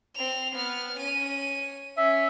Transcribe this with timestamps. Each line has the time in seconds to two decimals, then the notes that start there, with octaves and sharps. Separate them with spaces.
0.15 C4 F7
0.55 B3 F6
0.98 C#4 D#7
1.98 C#4 E5